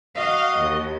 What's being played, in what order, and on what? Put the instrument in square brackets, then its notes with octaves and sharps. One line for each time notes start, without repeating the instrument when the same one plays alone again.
[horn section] F#4 D#5 [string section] F5
[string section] D#2